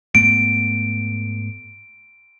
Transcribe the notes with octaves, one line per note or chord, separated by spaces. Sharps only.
G#2 A3 B3 D7